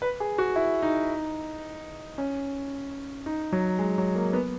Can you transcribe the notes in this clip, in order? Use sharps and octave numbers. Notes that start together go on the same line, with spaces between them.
B4
G#4
F#4
E4
D#4
C#4
D#4
F#3
G#3
F#3
A#3
B3